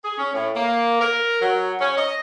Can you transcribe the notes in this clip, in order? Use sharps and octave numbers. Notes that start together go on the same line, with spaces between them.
G#4
C#4
A2
A#3
A#4
F#3
C#4
D#5